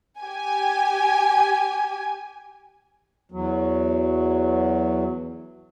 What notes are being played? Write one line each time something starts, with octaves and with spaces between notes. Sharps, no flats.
G4 G#5
E2 F#3